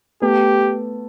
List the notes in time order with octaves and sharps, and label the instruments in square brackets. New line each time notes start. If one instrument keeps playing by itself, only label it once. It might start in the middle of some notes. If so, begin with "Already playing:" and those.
[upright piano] A3 B3 [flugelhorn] G4